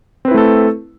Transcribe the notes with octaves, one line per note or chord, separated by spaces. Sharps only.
A3 C4 E4 A4 B4